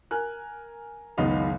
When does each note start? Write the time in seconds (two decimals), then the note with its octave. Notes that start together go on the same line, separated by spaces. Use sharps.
0.11 A#4 G#5 F#6
1.18 F#1 C#2 D#3 B3 D#5 F5